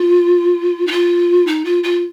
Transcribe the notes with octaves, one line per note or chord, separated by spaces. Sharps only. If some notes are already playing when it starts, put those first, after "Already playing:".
Already playing: F4
D#4
F4
D#4
F4
F4